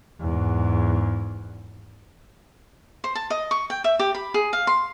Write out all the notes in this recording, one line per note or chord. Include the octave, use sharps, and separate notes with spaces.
E2 G#2
C5
A5
D#5
C#6
G5
E5
G4
B5
G#4
F5
C6